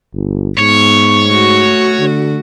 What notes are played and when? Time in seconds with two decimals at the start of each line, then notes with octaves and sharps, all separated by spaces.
0.14 G1
0.59 G#2 B3 C#5
1.31 A3 F#4
1.99 D3